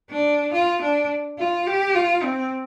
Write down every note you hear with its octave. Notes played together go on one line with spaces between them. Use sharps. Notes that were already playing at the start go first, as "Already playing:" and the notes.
D4
F4
D4
F4
G4
F4
C4